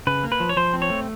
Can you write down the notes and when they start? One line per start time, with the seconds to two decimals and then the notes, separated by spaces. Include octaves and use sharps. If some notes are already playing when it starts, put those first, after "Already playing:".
0.07 C#3 B4
0.24 A#3
0.32 B4
0.40 F3
0.49 C#5
0.57 F3 C5
0.73 C4
0.82 C#5
0.90 A3